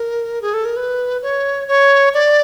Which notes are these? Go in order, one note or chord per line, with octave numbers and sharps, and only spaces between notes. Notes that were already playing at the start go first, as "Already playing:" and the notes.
Already playing: A#4
G#4
A4
A#4
B4
C#5
C#5
D5